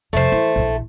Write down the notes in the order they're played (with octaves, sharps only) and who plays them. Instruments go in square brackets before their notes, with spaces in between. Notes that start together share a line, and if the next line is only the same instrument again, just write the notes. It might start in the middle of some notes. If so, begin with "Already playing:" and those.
[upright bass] F2 C3 [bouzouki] A3 C5
[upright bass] E3
A#1 E3